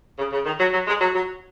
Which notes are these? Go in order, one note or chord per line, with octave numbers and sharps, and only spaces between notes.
C#3
C#3
D#3
F#3
F#3
G#3
F#3
F#3